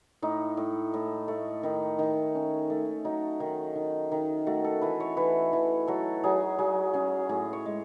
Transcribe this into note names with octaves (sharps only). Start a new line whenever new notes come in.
A2 D#4
A2
A2
A3
D#3 D#4
D#3
C#4
A3
F#3 D#4
D#3
D#3
D#3
A3 F#4
A4
E3 B4
C#5
E3 B4
E3
F#3 A4
F#3 G#4
F#3 G#4
C#4 G#4
A2 G#4
C#5
G#3